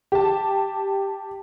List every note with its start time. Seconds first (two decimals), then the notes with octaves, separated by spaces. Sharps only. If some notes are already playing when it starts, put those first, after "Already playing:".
0.12 G4 A5